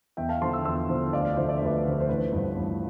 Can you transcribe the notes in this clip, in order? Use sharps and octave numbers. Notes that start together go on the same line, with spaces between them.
E2 E5 G5
F5 A5
D3 F3 A5 C6
C6 E6
E2 C6 E6
D3 F3
D2 D5 F5
D5 F5
D3 F3 C5 E5
D5
E5
D2 B4 D5
D3 F3
C5
A1 B4
G2 F3
A1